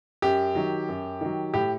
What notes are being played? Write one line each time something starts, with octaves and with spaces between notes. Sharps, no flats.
F#2 G4
D#3 F#3
F#2
D#3 F#3
A2 G4